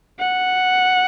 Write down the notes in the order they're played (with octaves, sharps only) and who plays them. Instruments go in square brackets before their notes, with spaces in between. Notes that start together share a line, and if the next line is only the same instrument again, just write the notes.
[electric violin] F#5